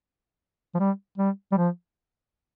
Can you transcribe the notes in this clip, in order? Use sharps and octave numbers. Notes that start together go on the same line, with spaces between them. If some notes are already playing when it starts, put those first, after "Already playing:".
F3
G3
G3
G3
F3